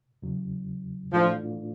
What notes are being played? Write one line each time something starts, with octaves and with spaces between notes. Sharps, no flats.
E2 C#3 F#3
A2 E3 F3 A3 D4 F4